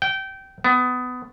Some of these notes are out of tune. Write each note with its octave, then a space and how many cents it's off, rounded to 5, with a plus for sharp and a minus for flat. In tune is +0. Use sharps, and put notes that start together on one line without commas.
G5 -20
B3 +20